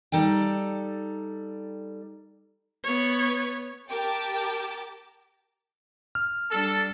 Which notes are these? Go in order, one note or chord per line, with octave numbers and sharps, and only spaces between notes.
G3 D#4 A4 G5
B3 C#5
G4 A#4 G5 A5 D6
F6
G3 D4 A4